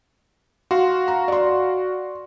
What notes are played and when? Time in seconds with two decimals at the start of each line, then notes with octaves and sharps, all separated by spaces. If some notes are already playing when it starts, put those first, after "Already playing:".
0.71 F#4 F5 C6
1.08 A#5
1.28 D5 C6